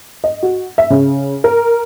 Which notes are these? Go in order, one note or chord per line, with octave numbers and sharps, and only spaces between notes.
D#5
F#4
E5
C#3
A#4